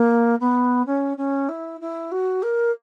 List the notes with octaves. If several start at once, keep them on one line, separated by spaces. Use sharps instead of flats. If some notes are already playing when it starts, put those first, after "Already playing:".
Already playing: A#3
B3
C#4
C#4
E4
E4
F#4
A#4